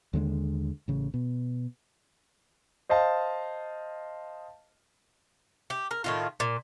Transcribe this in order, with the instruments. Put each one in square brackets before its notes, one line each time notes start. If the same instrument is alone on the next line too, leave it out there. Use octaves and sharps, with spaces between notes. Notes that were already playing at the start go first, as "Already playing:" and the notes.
[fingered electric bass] D#2 D3 G3 G#3
A1 C#3
B2
[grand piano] C5 D#5 F5 A5
[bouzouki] G4
A#4
A2 D#3 F4
A#2